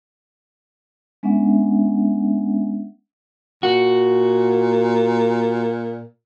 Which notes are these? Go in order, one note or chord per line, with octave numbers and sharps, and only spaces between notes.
G#3 B3 C#4 D4 E5 F#5
A#2 F#4